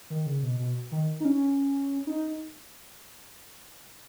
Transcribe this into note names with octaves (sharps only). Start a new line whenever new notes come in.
D#3
C#3
B2
B2
D#3
D#4
C#4
D#4